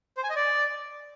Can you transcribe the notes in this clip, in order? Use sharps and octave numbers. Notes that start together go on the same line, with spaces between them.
C5
G#5
D#5
D5